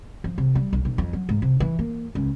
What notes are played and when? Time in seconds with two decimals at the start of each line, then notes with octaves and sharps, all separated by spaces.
0.24 F3
0.38 C3
0.55 G3
0.73 B1
0.85 B1
0.98 F2
1.13 F#3
1.29 G#2
1.42 C3
1.60 E3
1.79 A#3
2.15 C#2